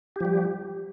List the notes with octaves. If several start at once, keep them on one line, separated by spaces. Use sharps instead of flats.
F3 G3 G4